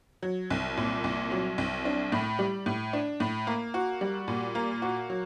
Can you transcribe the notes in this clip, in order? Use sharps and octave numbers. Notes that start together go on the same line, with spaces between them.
F#3
C2
A#2
C2
F#3
C2
D4
A2
G3
A2
D4
A2
A#3
F#4
G3
A#2
A#3
F#4
F#3